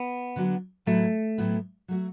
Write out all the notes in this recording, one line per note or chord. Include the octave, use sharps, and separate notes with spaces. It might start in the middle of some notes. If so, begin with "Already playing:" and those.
Already playing: B3
D3 F#3 D4 F#4
A2 F#3 A3 B3 E4
A2 F#3 B3 E4
F#3 A3 F#4